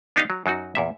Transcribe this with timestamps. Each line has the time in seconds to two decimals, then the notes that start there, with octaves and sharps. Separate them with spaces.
0.16 B3 D4 D#4 G4 D#5 F5
0.30 F#3
0.46 F#2 F#3 D#4 F#4
0.75 E2 A#2 E5